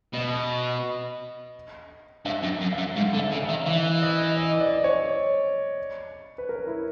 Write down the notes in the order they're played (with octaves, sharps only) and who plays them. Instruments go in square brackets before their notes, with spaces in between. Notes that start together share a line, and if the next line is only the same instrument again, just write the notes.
[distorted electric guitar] B2 [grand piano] D#5
[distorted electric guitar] G2 [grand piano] E5
[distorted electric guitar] F#2
F#2
[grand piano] E5
[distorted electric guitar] F#2
[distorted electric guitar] G#2 [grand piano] F5
[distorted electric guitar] D3
[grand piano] E5
[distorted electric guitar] C#3
[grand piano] E5
[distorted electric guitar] D#3
[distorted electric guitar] E3 [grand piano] E5
[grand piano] D#5
D#5
D5
C#5
B4
A#4
E4